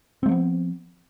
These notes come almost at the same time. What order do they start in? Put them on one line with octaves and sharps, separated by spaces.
C4 G#3 F3 B3